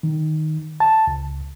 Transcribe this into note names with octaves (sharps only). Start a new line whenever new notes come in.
D#3
A5
C#2